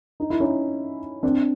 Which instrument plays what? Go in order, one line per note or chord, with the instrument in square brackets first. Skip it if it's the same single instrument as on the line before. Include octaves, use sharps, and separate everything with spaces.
[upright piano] D#4
E4
C#4 D#4
C4 D4